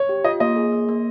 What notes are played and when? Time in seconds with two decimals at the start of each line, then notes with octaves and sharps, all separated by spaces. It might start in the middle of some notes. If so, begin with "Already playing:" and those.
Already playing: C#5
0.09 G4
0.24 F4 D#5
0.40 A#3 D#5
0.56 G#4
0.73 A#3
0.88 A#3